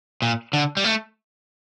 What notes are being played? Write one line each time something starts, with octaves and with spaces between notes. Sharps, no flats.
A#2
D3
G3
A3